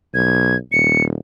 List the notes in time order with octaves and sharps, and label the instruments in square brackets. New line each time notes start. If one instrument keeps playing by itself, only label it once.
[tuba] B1 [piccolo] G#6
[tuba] D#1 [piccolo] C#7